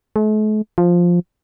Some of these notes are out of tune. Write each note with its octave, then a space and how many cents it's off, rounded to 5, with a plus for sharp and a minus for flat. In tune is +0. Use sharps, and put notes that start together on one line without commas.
A3 -45
F3 +5